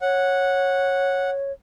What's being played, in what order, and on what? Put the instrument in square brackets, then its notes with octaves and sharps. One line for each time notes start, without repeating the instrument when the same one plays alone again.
[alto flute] C#5 [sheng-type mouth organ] F#5